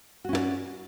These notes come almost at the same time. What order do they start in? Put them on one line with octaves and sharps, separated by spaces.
F#4 C#4 E4 D5